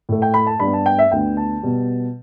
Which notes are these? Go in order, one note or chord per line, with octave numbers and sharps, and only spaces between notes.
A2 A3
G5
B5
A5
G2 G3 B3 B5
A5
G5
E5
D2 D3 B3 G5
A5
B2 G3 B3